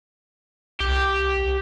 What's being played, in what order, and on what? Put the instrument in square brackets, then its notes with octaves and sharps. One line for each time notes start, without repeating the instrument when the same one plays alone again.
[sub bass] C2 [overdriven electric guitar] G4